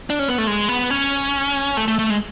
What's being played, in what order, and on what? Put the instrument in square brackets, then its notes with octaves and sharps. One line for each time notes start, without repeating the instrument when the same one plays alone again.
[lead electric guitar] D4
C#4
B3
A3
G#3
B3
C#4
A3
A3
A3
G#3